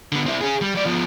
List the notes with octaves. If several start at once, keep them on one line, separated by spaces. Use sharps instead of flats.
D3 B3
C4 E4
C#4 G#4
G3
F#3 D5
F3 B3